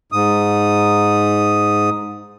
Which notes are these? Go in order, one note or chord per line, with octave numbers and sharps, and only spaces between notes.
G#2 D#6